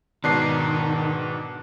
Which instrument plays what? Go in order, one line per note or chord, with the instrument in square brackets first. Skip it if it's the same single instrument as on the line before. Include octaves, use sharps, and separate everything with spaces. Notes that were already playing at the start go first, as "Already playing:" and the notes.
[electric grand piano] G#2 B2 C7 [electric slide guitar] D#3 [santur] D4